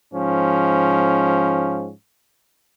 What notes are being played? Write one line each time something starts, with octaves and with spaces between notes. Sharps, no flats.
G#2 F3 C#4